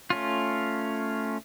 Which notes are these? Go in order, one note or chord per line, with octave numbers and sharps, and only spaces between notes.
A3 C#4 F4